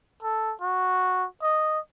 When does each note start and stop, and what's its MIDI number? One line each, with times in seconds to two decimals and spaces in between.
0.23 0.53 69
0.61 1.25 66
1.42 1.79 75